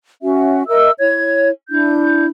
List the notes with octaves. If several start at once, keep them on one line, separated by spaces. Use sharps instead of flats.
C#4 F#4 E5
A#4 D#5 E5 E6
E4 C#5 G#6
D4 E4 G6